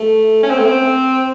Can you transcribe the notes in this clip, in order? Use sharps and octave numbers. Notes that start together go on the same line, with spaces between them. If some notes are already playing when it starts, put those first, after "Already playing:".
Already playing: A3
C#4
C4
A3
C4